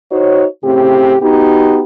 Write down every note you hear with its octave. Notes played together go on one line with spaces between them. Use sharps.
D#4 F#4 C5 C#5
A2 C#3 C4 G4
B3 D#4 F#4 G4